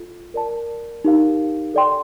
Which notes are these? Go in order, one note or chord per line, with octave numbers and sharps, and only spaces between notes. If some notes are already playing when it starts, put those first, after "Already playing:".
Already playing: F4 A4
A#4 D5 A5
D#4 G4 A#4 F5
A4 D5 G5 C6